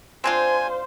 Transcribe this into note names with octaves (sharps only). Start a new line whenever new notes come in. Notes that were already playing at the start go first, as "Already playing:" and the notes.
C4 D4 F4 C5 G#5